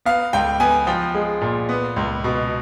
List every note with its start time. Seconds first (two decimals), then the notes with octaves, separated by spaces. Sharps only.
0.05 B3 F5
0.33 C#2 G5
0.60 B3 G#5
0.87 F3 G5
1.15 G#3
1.41 A#2
1.69 B3
1.96 C#2
2.24 B2